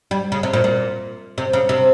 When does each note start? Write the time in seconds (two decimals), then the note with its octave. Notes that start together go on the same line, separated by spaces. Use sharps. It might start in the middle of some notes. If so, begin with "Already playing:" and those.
0.11 G3
0.32 C#3
0.43 C3
0.53 A#2
0.64 A#2
1.38 C3
1.53 C#3
1.69 C3